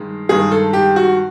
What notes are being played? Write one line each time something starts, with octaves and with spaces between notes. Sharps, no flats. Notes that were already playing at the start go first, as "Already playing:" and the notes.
Already playing: G2 D#3 G#3
G2 D#3 G#3 G#4
A4
G4
F#4